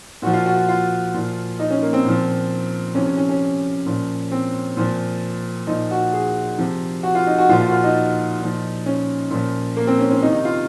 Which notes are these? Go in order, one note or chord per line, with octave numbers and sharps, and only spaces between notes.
A#2 F3 F#4
F4
F#4
F#4
F4
A#2 F3
D#4
C#4
A#3
C4
A#2 F3
C3 F3 C#4
C#4
C#4
C#4
A#2 F3
C4
A#2 F3
A#2 F3 D#4
F#4
G#4
C3 F3
F#4
F4
D#4
F#4
A#2 F3 F4
F4
F#4
F4
D#4
A#2 F3
C#4
A#2 F3
A#3
C4
C#4
C#4
C3 D#3 D#4
D#4
F4